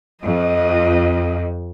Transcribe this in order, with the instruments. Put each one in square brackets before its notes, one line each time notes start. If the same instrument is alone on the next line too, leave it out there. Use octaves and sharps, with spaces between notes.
[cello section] F2 [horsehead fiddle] D#5